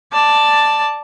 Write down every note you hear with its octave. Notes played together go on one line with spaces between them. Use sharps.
D5 A5